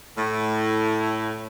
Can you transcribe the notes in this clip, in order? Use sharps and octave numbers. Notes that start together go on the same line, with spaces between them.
A2